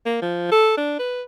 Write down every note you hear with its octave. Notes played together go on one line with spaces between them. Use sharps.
A#3
F3
A4
D4
B4